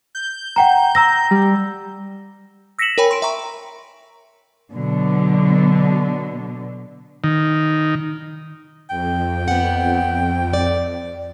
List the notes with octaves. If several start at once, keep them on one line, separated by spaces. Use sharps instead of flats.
G6
F#5 G5 A#5
A#5 E6 A#6
G3
E6 A#6 B6 C#7 E7 F#7
A#4 C#5 G5 G#5 B5
C6 D7
E5 G5 A#5 C#6
B2 D3 F#3
D#3
F2 G5
B3 F#5
D5